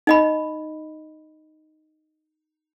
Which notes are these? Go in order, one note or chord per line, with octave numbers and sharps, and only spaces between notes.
D#4 D#5 B5